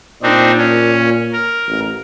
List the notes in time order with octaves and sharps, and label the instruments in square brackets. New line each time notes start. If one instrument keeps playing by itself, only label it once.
[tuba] A#2 [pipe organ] C4 D4 D#4
[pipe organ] C#4
A#4
[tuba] A1